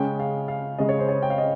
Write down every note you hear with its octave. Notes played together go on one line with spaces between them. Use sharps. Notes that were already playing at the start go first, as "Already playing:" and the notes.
Already playing: C#3 G#3 C#4 G5
F5
F5
C#3 G#3 C#4 D#5
C#5
C5
C#5
G5
F5
D#5